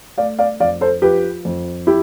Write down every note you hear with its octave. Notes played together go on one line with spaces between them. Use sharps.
A3 D5 F5
D5 F5
F2 D5 F5
A4 C5
F3 G4 B4
F2
E4 G4